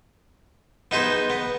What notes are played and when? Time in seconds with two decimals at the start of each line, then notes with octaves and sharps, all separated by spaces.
0.91 B3 D#4 G#4 C5
1.30 B3